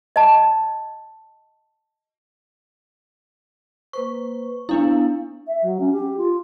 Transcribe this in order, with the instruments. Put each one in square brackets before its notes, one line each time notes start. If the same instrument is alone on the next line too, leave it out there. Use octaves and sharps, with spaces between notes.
[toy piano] D#5 A5
[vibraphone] A#3 B4 C5 [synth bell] C#6
[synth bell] B3 D4 E4 [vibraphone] F5
[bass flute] E5
F#3
C#4
G4
F4